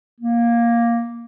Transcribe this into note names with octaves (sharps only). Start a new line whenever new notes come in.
A#3